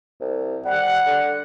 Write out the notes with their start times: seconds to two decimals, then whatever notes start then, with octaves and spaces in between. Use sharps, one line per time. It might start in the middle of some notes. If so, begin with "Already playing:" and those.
0.21 C2
0.65 G3 F#5
1.07 D3